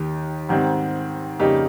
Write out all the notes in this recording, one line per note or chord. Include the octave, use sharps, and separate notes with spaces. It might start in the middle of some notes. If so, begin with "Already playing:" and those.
Already playing: D#2 D#3 G4
G#2 D#3 G3 C4
F2 C#3 G3 A#3 D#4 G4